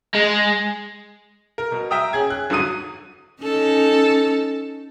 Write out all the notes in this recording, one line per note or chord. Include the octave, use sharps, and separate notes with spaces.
G#3
A#4
B2
E5 G5 A#5 D#6
C#4 G#4 G#6
F#6
G1 D3 F#3 D#6 D#7
C#4 D#4 A4